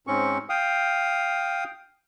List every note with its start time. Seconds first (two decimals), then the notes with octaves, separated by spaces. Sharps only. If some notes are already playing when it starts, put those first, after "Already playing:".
0.07 G#2 C4 C#4 C#6
0.49 F5 G5 D#6